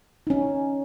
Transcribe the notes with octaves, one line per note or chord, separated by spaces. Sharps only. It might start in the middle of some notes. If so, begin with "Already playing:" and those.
D#4
C#4